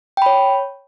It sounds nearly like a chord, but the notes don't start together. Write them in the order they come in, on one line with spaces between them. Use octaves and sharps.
G5 B5 C#5